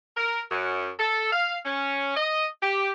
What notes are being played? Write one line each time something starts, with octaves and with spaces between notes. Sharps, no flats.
A#4
F#2
A4
F5
C#4
D#5
G4